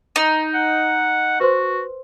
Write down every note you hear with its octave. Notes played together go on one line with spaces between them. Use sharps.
D#4
F#5
F#4 B4 C5 C6